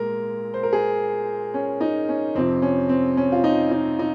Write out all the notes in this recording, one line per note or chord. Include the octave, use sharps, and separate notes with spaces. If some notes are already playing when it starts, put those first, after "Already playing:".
Already playing: A#2 G#3 A#4
C5
A#4
G#4
C#4
D#4
C#4
F2 C3 F3 C4
C#4
C4
C#4
F4
D#4
D#4
D#4